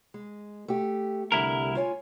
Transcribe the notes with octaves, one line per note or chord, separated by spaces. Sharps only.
G#3
A3 G4
C2 D3 G3 E4 A#4
F4 C#5 G#5